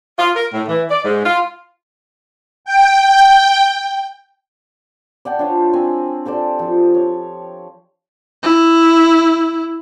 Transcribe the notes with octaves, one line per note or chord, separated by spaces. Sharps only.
F4
A#4
A2
E3
D5
G#2
F4
G5
D5 F#5 G5 A5
D4 F4 C5 C#5
C4 G#5
G4 A4 C5 D5
F3
C#5
E4